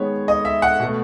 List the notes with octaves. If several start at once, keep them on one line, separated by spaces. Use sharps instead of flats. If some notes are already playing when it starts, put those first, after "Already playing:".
Already playing: D#3 G#3 B3 C#5
D#5
E5
F#5
B2
A3